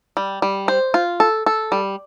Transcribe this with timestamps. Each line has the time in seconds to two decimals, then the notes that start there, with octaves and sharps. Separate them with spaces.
0.17 G3
0.42 G3
0.68 C5
0.94 F4
1.20 A4
1.46 A4
1.72 G3